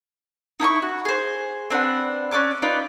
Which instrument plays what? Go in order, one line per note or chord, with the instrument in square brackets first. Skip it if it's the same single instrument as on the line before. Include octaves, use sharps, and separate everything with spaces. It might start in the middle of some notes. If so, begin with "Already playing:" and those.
[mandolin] D#4 E4 A#5 C#6
F#4
G#4 C5
C4 D4 B4 F#5
C#4 D5 D6 F#6
D#4 F4 B4 D5